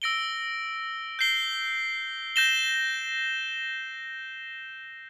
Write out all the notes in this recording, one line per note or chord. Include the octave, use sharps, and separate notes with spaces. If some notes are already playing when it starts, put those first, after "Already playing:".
E6 A#6 D7 G7
G6 C7 G7
G6 A#6 E7 G7